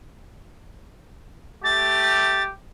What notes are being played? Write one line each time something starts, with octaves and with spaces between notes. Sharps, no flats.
A3 G4 A6